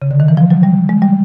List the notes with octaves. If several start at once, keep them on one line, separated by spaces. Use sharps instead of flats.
C#3
D3
D#3
E3
F3
F#3
G3
G#3
G3